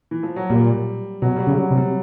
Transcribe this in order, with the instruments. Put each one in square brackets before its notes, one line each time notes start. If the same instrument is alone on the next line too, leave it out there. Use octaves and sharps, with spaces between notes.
[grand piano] E3
F3
F#3
[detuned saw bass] A#2 [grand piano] G3
[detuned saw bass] B2 [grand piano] F#3
[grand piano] G3
F#3
[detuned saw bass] C#3
[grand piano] G3
F#3
[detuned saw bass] C3
[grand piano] G3